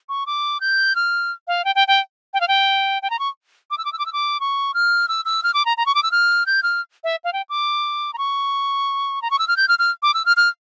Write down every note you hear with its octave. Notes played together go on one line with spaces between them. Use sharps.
C#6
D6
G6
F6
F5
G5
G5
G5
G5
F5
G5
G5
A#5
C#6
D6
E6
D6
E6
D6
E6
D6
C#6
F6
E6
E6
F6
D6
A#5
A#5
C#6
D6
E6
F6
G6
F6
E5
F5
G5
D6
A#5
C#6
A#5
C#6
E6
F6
G6
F6
F6
D6
E6
F6
F6